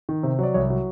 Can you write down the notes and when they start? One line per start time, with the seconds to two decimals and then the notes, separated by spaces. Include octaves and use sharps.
0.09 D#3
0.23 C3
0.39 F#3 D5
0.54 C2 C#5
0.70 F#3